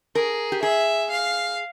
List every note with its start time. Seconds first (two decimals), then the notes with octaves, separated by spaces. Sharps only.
0.15 G#4 A#4
0.52 G4
0.62 G#4 E5
1.11 F5